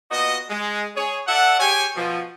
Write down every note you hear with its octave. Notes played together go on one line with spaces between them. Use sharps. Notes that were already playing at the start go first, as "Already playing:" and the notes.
A#2 B3 F#4 D#5
G#3
G#4 C#5
A4 D5 E5 F#5
G4 G#4 C#5 G5 G#5
B2 F3